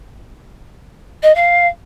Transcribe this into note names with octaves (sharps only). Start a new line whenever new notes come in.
D#5
F5